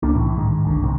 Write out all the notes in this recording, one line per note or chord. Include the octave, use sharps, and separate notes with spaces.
C#2 A#3 C#4 D4
C2 A2 E3
G#2 D#3 G#3
G1 C2 D3
C2 C3 D#3 C4